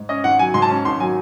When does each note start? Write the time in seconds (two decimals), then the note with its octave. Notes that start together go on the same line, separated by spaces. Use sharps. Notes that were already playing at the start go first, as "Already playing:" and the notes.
Already playing: G#2
0.09 C#4 D#5
0.24 G#1 F#5
0.39 F#3 G#5
0.54 G#2 C6
0.62 A5
0.70 C#4
0.85 G#1 C6
1.00 F#3 G#5